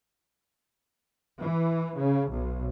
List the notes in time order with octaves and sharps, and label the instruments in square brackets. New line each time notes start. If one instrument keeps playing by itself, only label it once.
[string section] E3
C#3
B1